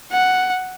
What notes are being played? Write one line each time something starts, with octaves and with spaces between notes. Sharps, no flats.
F#5